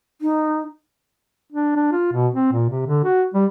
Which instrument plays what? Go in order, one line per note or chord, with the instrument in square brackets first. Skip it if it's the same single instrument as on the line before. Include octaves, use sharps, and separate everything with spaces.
[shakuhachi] D#4
[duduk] D4
D4
F4
B2
C4
A#2
C3
D3
F#4
G3